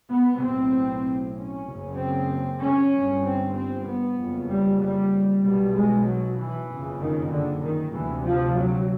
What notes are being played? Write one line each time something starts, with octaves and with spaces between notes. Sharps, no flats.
B3
B1 A2 C4
C#4
F#1 F#2 C#3
C4
C#4
G1 G2
C4
C4
B3
F#1 F2 C#3
G3
G3
B1 B2 G3
G#3
F#3
E3
F#1 F2 C#3
D#3
D3
D#3
D2 C3 E3
F3
F#3